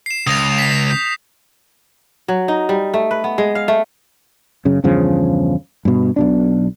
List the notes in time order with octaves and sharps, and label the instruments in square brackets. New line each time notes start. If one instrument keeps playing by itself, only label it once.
[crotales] C7 E7
[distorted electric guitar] C#2 [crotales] D#6 A#6 F7
[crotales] B6 C7
G6
[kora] F#3
D#4
G3
A3
B4
B3
G#3
F5
A3
[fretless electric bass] F#2 C#3
E2 G2 C#3 F3
G2 B2
B1 B2 D4